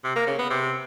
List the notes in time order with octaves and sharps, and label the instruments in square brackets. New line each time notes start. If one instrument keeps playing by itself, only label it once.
[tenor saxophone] C3
A#3
C#3
B3
C3